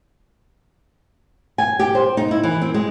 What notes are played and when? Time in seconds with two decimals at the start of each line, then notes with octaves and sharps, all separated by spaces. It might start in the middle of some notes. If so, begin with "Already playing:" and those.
1.58 G#5
1.79 G4
1.95 C5
2.17 D#4
2.31 E4
2.43 E3
2.62 C4
2.74 G#3